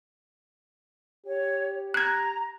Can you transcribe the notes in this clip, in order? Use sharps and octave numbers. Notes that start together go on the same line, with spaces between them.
G4 C#5
A#5 F#6 G#6